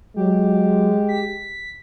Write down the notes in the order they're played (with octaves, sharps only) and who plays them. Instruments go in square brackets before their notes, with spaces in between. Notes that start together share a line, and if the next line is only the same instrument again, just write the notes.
[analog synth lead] F#3 [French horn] G#3 [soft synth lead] G4
[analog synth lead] B6